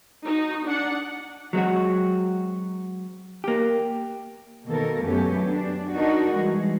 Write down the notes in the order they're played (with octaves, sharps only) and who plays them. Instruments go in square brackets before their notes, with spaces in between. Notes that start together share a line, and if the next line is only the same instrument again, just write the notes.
[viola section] D#4 F#4
D4 F#5
[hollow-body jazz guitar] F#3 G#3 C4 F#4
A#3 G4
[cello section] B2 D#3 A#3 A4 A#4
F#2 F#3 A3 B3 C#4 G4
D4
D4 D#4 F#4 A#4
E3 G3 G#3